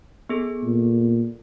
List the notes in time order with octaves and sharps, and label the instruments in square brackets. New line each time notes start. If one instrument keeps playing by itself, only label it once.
[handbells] B3 G#4 A4
[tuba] A#2